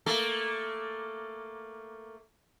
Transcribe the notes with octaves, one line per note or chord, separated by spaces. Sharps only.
A3 A#3 A4